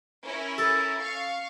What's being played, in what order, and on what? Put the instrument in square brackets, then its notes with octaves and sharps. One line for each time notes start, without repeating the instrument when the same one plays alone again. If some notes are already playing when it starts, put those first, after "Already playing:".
[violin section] C#4 E4 A#4
[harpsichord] A4
[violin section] F5 C#6